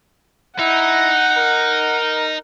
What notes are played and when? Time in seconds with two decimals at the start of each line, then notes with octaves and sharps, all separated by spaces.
0.59 D#4 E4 F#5
1.37 A#4